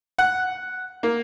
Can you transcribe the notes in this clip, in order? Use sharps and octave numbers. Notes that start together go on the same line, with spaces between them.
F#5
A#3